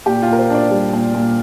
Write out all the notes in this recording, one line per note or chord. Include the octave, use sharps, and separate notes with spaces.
A#2 G4
F4
A#2 A#4
C5
D4 D5
G3
A#2
A#2